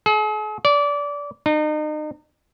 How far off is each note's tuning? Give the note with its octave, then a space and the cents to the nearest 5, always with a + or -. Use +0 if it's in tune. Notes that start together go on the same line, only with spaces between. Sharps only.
G#4 +45
D5 -25
D#4 -35